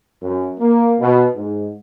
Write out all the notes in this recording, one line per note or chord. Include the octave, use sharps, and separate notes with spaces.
F#2
A#3
B2
G#2